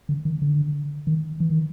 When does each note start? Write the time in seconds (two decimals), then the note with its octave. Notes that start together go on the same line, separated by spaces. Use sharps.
0.09 D3
0.25 D#3
0.42 D3
1.07 D#3
1.40 E3
1.50 D#3